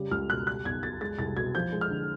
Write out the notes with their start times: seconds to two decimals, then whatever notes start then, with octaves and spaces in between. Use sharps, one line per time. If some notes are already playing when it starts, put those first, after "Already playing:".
Already playing: C#3 G3
0.11 C#2 F6
0.29 B2 F#6
0.47 G3 F#6
0.65 B1 G#6
0.83 B2 A6
1.01 G#3 A6
1.18 C2 A6
1.36 B2 G#6
1.55 F3 G6
1.72 G#3
1.81 F6
1.90 D3